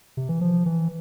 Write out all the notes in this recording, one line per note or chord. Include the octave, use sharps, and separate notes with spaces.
C3
E3
F3
E3